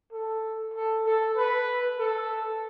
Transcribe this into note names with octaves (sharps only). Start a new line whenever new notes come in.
A4
A4
A4
B4
A4